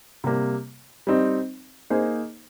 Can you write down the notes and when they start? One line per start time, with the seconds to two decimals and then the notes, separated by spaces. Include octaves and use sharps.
0.24 C3 G3 A#3
1.07 G3 C4 D#4
1.90 A#3 D#4 G#4 C5